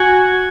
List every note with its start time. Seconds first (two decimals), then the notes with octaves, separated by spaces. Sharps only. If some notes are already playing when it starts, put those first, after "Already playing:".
Already playing: F#4 G#5